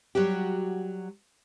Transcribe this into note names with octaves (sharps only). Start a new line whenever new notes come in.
F#3 G3 F#4 G4